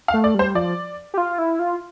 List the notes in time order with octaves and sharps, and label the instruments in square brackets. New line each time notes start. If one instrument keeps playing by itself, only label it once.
[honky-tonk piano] F5
[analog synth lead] A3
[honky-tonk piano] D5
[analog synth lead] G3 [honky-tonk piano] C5
[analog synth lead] F3 [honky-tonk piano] D5
[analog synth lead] G4
F4
E4
F4